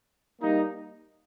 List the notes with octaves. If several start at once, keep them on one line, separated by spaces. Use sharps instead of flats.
G3 A#3 D#4